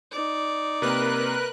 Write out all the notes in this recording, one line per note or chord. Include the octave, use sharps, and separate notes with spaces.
D#4 D5
C3 A#3 C4 A#4 B4 F#6